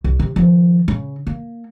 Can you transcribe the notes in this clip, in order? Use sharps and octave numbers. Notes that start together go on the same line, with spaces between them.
C2
C3
D#3 F3
C#3
A#3